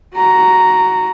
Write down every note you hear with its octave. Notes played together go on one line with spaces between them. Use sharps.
F#4 A#5